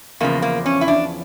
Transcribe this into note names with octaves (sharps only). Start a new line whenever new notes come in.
E2 C#3 F3 A#3
A#3
C#4
E4
D4